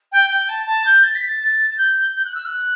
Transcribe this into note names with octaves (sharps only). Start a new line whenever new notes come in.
G5
G5
A5
A5
G6
A6
B6
A6
A6
A6
G6
G6
F#6
E6
F#6